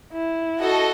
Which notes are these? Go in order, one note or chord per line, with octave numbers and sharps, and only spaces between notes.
E4
F#4 A4 D#5